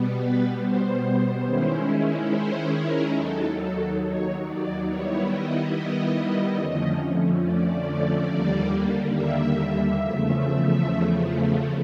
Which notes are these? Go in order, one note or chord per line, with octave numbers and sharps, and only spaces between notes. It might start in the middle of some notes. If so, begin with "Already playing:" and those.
Already playing: B2 G3 B3
B4
C5
D#3 G#3 C#4 E4
C5
A#4
D#2 D#3 F#3 A4
A4
C#5
D5
D#3 G3 B3 E4 C#5
D#5
D#5
F2 D3 F3 A3 C#4
D5
D#2 D3 G3 A#3
E5
E2 C#3 F3 A3